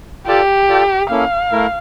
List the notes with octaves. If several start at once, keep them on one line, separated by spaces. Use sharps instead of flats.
F4 G4 A4 D5 A5
F4 A4 D5 G5
A#3 C#4 E4 A4 F5
A3 E4 A#4